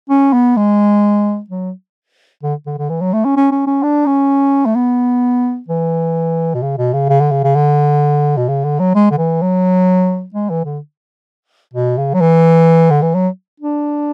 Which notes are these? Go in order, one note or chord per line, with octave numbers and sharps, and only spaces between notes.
C#4
B3
G#3
F#3
D3
D3
D3
E3
F#3
A3
C#4
C#4
C#4
C#4
D4
C#4
A3
B3
E3
B2
C#3
B2
C#3
C#3
D3
C#3
C#3
D3
B2
C#3
D3
F#3
G#3
D3
E3
F#3
G#3
E3
D3
B2
C#3
F#3
E3
D3
E3
F#3
D4